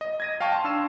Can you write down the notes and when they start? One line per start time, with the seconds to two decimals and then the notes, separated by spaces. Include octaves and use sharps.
0.01 D#5
0.20 G#6 A#6 D#7
0.41 F5 G5 A5 C#6
0.52 A5 C6
0.64 D4 E6 C7 E7